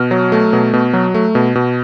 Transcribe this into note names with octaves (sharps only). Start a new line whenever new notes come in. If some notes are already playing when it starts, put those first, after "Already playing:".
Already playing: B2 F6
F#3
A3
B2
B2
F#3
A3
B2
B2